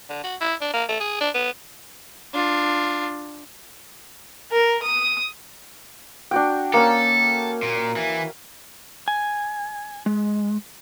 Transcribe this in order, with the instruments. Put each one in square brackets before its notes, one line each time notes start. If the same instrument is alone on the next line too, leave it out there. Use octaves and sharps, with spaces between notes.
[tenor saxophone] D3
F#4
E4
D4
A#3
A3
G#4
D4
B3
[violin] D4 F4
[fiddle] A#4
D#6
[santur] D4 F#4 G5
[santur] A#3 C#4 [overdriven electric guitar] A4
[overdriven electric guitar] A#2
E3
[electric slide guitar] G#5
G#3